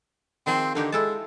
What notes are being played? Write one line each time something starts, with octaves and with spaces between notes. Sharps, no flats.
D#3 F3 C4 G#4
D3 A#3 D#4 G4
G#3 E4 A4 A5